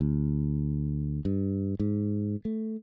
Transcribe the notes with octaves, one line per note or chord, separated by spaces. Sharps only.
D2
G2
G#2
A3